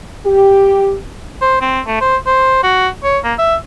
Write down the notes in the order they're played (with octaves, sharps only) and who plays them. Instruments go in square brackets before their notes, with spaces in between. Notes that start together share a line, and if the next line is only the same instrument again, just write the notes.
[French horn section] G4
[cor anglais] C5
C4
A3
C5
C5
F#4
C#5
A#3
E5